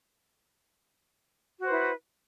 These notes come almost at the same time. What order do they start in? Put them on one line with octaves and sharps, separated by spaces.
F#4 C5 B4 E4